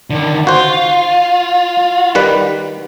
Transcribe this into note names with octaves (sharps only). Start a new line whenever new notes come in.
D3 D#3
F4 F#4 C5
D#3 G3 B4